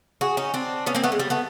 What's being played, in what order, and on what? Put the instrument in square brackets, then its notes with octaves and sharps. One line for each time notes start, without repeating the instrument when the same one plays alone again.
[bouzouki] F#4 G#4
C#4 D#4
C4 D4
B3 C#4
A#3 C4
A3 B3
G#3
G3
A3 B3